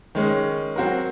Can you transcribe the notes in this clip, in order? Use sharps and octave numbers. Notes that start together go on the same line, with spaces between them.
D#3 G#3 C#4
F#3 C4 F#4 A#4